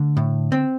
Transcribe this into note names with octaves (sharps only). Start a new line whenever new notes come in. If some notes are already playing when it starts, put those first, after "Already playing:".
Already playing: D3 A3
A2
C4